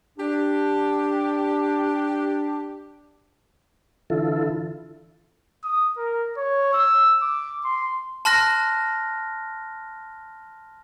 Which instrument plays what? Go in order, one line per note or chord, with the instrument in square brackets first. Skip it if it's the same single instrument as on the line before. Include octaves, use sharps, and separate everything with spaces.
[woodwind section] D4 [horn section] G4
[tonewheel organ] D3 E3 E4 F4 A4
[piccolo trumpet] D#6
A#4
C#5
E6
D6
C6
[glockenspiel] A5 C6 F6 F#6 A#6